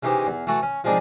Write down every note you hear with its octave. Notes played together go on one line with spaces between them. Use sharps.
C#3 E3 D#4 G4 C5
E2
E3 A3 F#4 A4
C#4
F3 G#3 C4 D4 D#4 G#4